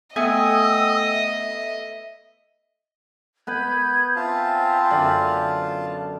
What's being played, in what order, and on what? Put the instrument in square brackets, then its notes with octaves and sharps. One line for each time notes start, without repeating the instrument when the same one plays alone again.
[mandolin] A3 B3 G#5 [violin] D#5 [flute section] G5 D#6 E6
[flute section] E5
[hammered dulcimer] B3 B4 B5 [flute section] G6 G#6
[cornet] C4 [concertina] F4 F5 A5 [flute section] C5 E5 G#5
[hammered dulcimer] F#2 D3 D5